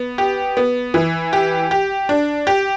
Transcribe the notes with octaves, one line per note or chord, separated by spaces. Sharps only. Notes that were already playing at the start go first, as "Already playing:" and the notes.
Already playing: B3
G4
B3
E3
G4
G4
D4
G4